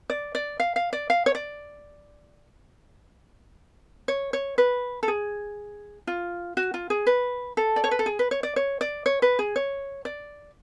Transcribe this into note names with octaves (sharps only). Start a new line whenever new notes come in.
D5
D5
F5
F5
D5
F5
C#5
D5
C#5
C#5
B4
A4
G#4
F4
F#4
F4
G#4
B4
A4
D5
C#5
B4
A4
G#4
B4
C#5
D5
C#5
D5
C#5
B4
G#4
C#5
D5